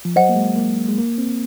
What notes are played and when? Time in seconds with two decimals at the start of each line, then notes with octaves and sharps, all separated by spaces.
0.05 F3
0.16 F#3 C5 D#5 F#5
0.29 A#3
0.36 G#3
0.56 A#3
0.88 G#3
0.98 A#3
1.18 C4